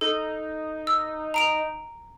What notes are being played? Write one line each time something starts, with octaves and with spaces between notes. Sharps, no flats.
D#4 A4
E6
A#5 D7 F7